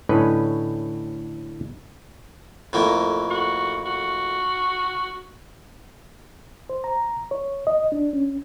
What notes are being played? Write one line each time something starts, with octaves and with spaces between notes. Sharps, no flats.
A2 D3 C#4 B4 D#5
F2 A2 A#3
F#4
F#4
C5
A#5
C#5
D#5
D4
C#4